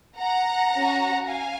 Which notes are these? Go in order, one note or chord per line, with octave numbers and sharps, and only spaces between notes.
F#5 A#5
C#4 F#4
F5 G#5